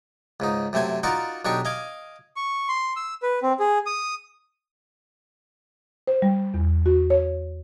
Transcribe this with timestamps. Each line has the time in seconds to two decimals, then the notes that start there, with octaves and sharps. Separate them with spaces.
0.40 C#2 G#2 D#4
0.73 F#2 C3 A3 C5 G#5
1.03 D#4 F4 F#4 A#4 D5 F#5
1.45 B1 D4 D#4 G4 C#6
1.65 D#5 F5 G#5 D6
2.36 C#6
2.68 C6
2.96 E6
3.22 B4
3.43 C4
3.60 G#4
3.86 D#6
6.07 C5
6.22 G3
6.54 E2
6.86 F#4
7.10 C#5